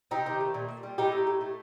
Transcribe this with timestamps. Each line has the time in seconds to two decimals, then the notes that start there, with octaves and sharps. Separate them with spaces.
0.11 C3 D#4 G4
0.26 D#3
0.41 A3
0.54 A#2
0.69 A#2
0.83 G3
0.98 A2 D#4 G4
1.12 A3
1.27 A2
1.41 A3